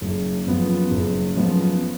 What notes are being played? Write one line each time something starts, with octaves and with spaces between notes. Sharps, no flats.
F#1
F#2 F3 B3 F4
F#1
F#2 F3 B3 F4